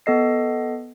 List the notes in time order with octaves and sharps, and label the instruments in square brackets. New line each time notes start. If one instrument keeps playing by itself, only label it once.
[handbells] B3 A4 D#5 C7